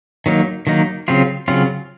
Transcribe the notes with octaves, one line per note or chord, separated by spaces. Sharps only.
D#3 F#3 A#3 D#4
D#3 F#3 A#3 D#4
C#3 F#3 C4 F4
C#3 F#3 C4 F4